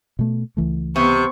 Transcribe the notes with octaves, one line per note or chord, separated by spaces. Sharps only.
B2 A3
C#2 E3 A3
C3 B3 C#6